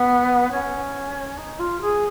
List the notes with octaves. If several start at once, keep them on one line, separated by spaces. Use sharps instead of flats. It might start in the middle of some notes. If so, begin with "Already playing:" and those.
Already playing: B3
C#4
D#4
F4
G#4